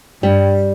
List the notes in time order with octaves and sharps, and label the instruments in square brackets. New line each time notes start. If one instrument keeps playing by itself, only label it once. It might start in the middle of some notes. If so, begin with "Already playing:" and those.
[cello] G2 [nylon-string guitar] G3